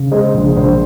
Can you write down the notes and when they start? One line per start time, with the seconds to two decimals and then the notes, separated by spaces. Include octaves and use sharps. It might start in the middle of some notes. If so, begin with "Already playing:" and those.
Already playing: C#3
0.11 G#3 C5 D#5
0.34 A#1
0.56 A#1 C5